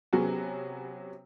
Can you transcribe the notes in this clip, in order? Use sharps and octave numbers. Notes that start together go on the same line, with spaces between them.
C3 F#3 B3 C#4 F#4 G#4